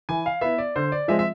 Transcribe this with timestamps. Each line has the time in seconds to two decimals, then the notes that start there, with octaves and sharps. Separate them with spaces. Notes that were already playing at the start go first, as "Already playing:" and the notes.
0.09 E3 G#5
0.26 F5
0.41 B3 E4 E5
0.58 D5
0.76 D3 C5
0.92 D5
1.08 F3 G#3 C4 E5
1.19 E5